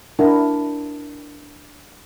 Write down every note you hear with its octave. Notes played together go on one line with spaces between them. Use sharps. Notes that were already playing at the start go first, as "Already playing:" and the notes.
D4 E4 A#4